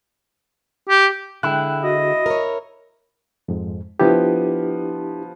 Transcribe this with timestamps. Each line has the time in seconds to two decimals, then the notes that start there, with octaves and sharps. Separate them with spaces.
0.89 G4
1.43 D3 G#3 E4 G5 F#6
1.84 F#4 D#5
2.26 A#4 C#5
3.48 F2 G#2
4.00 F3 B3 D4 E4 G4